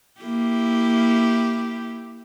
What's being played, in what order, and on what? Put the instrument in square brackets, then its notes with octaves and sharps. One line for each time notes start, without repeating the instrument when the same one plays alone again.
[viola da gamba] A#3 E4 G4